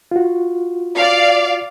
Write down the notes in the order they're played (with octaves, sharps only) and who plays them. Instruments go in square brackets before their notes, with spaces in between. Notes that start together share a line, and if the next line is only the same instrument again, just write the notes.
[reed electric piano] F4 F#4
[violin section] D5 F5